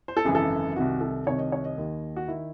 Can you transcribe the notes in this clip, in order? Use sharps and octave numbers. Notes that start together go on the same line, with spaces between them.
C5
A4
G#1 F#2 C#3 E3 G#4
A4
C2 C3 D#3 F#4
A4
C2 C3 D#3 C#5
D#5
C#5
D#5
D#2 D#3
F#4
D#3 E4